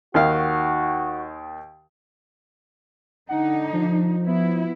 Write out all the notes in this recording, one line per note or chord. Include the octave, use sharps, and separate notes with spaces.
D#2 D#3 F#4 F5
D3 D#4 F#5
F3
B3 E4